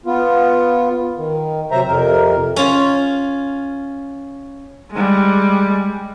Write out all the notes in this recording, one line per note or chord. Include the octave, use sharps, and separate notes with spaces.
B3 F4
D#3
C3 F#3 C5 E5 A#5
F2 C3 A#4
C#4 F4
G3 G#3